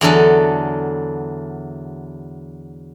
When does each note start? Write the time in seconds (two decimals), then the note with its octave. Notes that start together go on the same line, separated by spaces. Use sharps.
0.01 E2 D3 F#3 A4